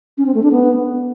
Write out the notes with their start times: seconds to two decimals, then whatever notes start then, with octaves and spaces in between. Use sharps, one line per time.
0.18 C#4
0.26 C4
0.34 A3
0.43 D4
0.51 B3